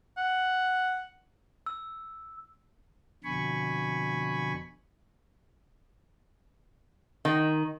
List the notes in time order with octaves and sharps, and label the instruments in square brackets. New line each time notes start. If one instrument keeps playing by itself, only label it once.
[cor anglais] F#5
[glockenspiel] E6
[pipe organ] F2 B2 D3 G#5 B5 C#6
[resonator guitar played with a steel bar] D#3